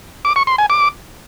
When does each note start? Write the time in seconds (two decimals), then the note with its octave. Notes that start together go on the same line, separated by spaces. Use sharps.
0.25 D6
0.36 C#6
0.47 C6
0.58 G#5
0.70 D6